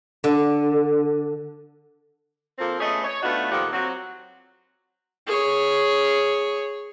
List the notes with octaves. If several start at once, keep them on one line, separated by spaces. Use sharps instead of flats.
D3
F3 A#3 C4 F4 A4 A#4
A3 B3 C#4 G#4 D#5
C#5
A3 B3 D4 D#4 F4 F#4
A#2 D#3 F3 G4 A4 F#5
F#3 C4 F#4
G#4 C#5